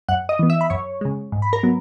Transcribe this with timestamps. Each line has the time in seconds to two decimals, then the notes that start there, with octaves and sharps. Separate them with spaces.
0.08 F#2 F#5 F#6
0.29 D#5 D#6
0.39 E3 B3
0.50 E5 E6
0.61 B5
0.70 F#2 C#5 C#6
1.01 C#3 G#3
1.32 G#2
1.42 B5
1.53 A#4 A#5
1.63 F#3 B3